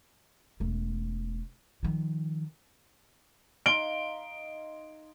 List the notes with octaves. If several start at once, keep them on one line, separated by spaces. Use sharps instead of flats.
E1 A3
D#3 F3
D#4 F5 C6 D7 G7